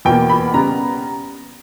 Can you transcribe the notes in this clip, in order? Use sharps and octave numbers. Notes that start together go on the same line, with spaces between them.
E2 B2 A#3 G5
B5
C#3 G3 B3 A#5